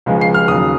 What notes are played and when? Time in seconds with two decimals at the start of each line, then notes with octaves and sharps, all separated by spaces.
0.06 C#2 C#3 F3 G#3
0.21 C7
0.34 F6
0.48 D#2 C#3 F#3 D#6